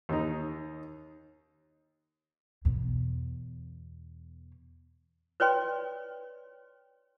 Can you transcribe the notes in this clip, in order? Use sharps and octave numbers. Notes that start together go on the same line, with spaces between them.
D#2 D#4
E2 B2
B4 C#5 D5 G5 C6